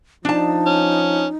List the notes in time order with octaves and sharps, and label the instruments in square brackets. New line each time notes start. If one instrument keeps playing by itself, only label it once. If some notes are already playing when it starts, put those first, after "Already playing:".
[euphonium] F3 [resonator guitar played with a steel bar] D4 A5 [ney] D#4
[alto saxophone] C#4